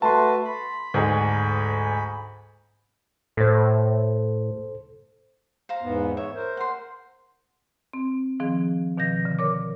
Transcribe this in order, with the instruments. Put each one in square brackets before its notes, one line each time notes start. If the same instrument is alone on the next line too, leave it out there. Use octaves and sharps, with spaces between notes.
[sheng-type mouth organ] A3 F#4 B4 [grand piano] A5 C6
[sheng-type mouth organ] B5
[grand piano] D2 G#2 G#4
[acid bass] A2 [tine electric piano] A4 C5
[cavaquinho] C5 F5 A#5
[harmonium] E2 G#2 B3
[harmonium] C#5 [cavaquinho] E5
[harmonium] A#4 C5
[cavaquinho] F#5 C6
[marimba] C4
D#3 F3 C4 G#4
B2 D#3 F3 G6 A#6
D3
A#4 C#5 D6